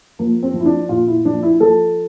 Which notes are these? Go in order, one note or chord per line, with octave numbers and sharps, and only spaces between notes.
F3 A#3
C4
F3
E4
D4
A#2 F4
E4
F3 D4
E4
F3 A4